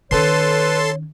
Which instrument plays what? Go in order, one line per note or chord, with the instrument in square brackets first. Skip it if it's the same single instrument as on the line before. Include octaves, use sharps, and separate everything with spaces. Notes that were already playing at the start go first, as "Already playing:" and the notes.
[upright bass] D#3 C#4 [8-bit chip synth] A4 A5 C6 [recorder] B4 [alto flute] C#5